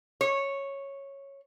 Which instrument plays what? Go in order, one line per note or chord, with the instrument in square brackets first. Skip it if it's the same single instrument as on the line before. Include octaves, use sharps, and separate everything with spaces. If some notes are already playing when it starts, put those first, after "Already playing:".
[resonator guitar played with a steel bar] C#5